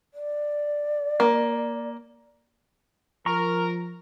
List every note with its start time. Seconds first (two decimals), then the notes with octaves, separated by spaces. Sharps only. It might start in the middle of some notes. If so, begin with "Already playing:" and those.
0.14 D5
1.20 A#3
3.26 F3 A#4 A#5 C#6